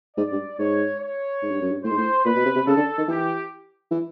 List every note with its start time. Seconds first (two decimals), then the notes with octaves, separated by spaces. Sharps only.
0.17 G#2 D5
0.32 G2
0.59 G#2 C#5
1.00 C#5
1.43 G#2
1.51 G2
1.62 F#2
1.71 G2
1.84 A2 C5
1.90 G#2
1.98 A2
2.25 A#2 B4
2.36 B2
2.46 C3
2.56 C3
2.66 C#3 A4
2.77 D3
2.98 D#3
3.08 E3 G4
3.91 E3